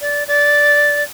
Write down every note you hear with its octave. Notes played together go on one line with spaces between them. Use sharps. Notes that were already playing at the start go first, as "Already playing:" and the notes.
D5
D5